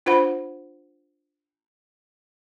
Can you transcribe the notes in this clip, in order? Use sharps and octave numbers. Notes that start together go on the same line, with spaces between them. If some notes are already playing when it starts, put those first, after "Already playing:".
D4 F4 C5 F#5 B5